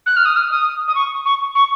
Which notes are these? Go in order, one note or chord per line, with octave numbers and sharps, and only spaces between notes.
F#6
F6
D#6
F6
D#6
D#6
C#6
C#6
C#6